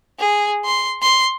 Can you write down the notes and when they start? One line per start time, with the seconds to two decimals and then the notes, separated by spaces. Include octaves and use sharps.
0.19 G#4
0.65 C6
1.02 C6